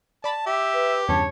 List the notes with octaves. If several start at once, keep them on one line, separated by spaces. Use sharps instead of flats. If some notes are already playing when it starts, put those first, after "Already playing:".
D5 A5 B5 A6
G4 E5
B4
E2 G2 C#3 C#5 A5